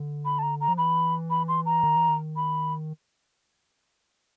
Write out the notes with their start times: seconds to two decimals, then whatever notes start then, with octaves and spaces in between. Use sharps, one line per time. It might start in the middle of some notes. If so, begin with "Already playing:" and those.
Already playing: D3
0.25 B5
0.39 A5
0.43 A#5
0.61 A#5
0.68 F3
0.78 E3 B5
1.30 B5
1.48 C6
1.66 A#5
1.83 D#3
1.96 E3
2.09 D#3
2.36 B5